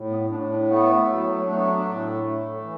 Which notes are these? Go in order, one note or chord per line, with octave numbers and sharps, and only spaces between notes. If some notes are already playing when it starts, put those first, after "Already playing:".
Already playing: A2
B3
A2 D4
D4
A3 B3
F#3
A3 D4
B3
D4
A2
A3
E3